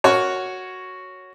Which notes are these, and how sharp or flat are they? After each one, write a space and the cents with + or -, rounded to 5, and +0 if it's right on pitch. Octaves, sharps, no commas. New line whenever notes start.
F#4 +0 A#4 +0 C#5 +0